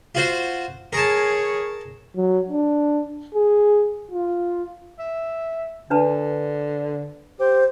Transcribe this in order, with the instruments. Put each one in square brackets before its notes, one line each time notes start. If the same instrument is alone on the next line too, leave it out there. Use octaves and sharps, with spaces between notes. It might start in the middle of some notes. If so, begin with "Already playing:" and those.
[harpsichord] F4 F#4 C5
[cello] G#4 C#5 [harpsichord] A#4 A5
[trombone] F#3
D4
G#4
F4
[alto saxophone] E5
[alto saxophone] D3 [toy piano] D4 B4 A5
[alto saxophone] G4 [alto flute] C5